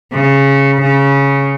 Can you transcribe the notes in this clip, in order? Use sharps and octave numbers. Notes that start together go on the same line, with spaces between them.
C#3
C#3